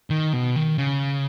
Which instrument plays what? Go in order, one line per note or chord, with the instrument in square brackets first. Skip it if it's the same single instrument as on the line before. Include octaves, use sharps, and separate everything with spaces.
[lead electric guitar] D#3
B2
D#3
C#3